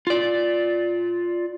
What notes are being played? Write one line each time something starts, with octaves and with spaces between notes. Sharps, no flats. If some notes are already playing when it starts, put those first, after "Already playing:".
F4 D5